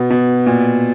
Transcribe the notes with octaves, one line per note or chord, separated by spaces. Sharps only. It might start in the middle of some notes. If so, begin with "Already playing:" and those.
Already playing: B2 B3
B2
A#2